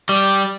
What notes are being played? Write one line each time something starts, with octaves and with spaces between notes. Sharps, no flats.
G3